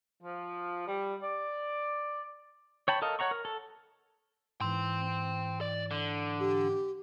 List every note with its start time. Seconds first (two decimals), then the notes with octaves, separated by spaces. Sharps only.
0.22 F3
0.87 G3
1.22 D5
2.88 C#5 G5 A5 B5
3.02 A4 A#4 D#5 F5
3.19 C#5 F#5 A#5 C#6
3.31 A#4
3.45 A4
4.61 G#2 E3 G5 C6
5.61 D5
5.91 D3
6.40 G4